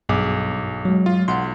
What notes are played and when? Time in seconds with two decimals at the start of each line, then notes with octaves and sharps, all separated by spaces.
0.09 B1 G2 G#4 D6
0.85 F#3 G#3
1.06 F4
1.28 B1 F5 F#5 C6